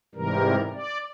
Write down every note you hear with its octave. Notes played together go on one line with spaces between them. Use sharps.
G#2 C3 E3 G3 A#4
D5